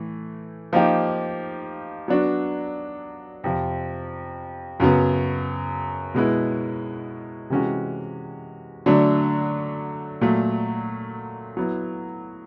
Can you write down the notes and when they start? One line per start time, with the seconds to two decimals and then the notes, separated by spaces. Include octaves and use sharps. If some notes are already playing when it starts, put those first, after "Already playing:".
Already playing: A2 E3 A3
0.73 F3 A#3 D#4 G4
2.08 F#3 B3 D4 F#4
3.44 F2 C3 F3
4.80 F#2 C#3 F#3 B3
6.14 B2 G#3 B3 E4
7.50 C3 E3 G#3 C#4 F#4
8.86 D3 F#3 A3 D4
10.21 A#2 F#3 A3
11.57 F#3 B3 E4